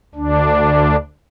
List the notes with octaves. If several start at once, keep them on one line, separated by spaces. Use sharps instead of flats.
D2 D4